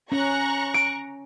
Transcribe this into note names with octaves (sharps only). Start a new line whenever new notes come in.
C#4 A#5 C#6 F#6
D7